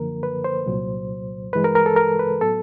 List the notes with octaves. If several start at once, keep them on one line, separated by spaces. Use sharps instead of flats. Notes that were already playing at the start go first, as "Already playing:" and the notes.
Already playing: F#2 D3 F3 A#3 A#4
B4
C5
C2 A#2 F#3
G2 E3 G#3 B4
A#4
A#4
A4
A#4
B4
A2 F#3 B3 A4